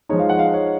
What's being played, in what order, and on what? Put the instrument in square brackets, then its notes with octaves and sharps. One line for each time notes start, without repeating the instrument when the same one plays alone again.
[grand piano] F3 G#3 D#4 C#5
F5
F#5
F5
C#5